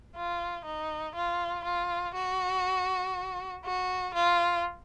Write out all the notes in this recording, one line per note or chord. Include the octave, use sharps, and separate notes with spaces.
F4
D#4
F4
F4
F#4
F#4
F4